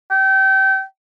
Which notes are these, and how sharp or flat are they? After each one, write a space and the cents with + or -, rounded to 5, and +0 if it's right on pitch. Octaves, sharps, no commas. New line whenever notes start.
G5 -30